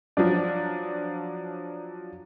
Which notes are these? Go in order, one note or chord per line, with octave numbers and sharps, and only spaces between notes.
F3 F#3 D4